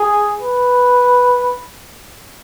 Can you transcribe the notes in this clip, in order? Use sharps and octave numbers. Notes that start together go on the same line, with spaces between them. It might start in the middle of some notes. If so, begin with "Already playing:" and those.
Already playing: G#4
B4